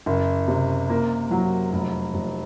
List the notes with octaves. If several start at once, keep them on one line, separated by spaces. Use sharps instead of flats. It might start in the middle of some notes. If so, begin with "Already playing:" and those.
F#1
C3
A#3
F#3
F1
F1